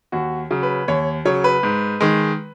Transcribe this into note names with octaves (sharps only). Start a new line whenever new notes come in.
D#2 F#4
C#3 F#3
B4
D#2 C#5
C#3 F#3 C#5
B4
G#2
D#3 G#3